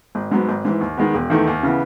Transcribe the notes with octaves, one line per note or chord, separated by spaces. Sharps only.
G#1
G#2 F#3 B3
G#1
G#2 E3
D#2
D#3 G#3 B3
E1
E2 D#3 A3
D#2
C#3 E3 B3